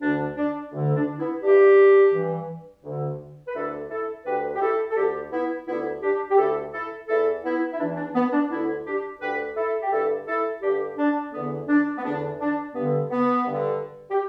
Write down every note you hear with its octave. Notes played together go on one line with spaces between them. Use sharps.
D2 D3 D4
D4
D2 D3
D4
B3 E4
G2 E3 D4 G4
G2 E3
D2 D3
B4
D2 D3 E4 A4
E4 A4
D2 D3 G4 B4
G4
E4 A4
A4
D2 D3 D4 G4
B3 E4
D2 D3 B3 E4
D4 G4
G4
D2 D3 E4 A4
E4 A4
E2 E3 E4 A4
B3 E4
E4
E2 E3 D4
D4
B3
D4
D2 D3 B3 E4
D4 G4
D2 D3 G4 B4
E4 A4
G4
G2 D3 E4 A4
E4 A4
G2 D3 D4 G4
D4
E2 D3 B3
D4
B3
E2 D3 D4
D4
G2 D3 B3
B3
G2 D3
G4